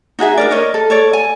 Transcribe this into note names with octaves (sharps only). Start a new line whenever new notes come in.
D#4 F#4 G#4 E5
D4 A#4 D5
A#4 C#5 D#5
A4
A4 C#5 D5
G#5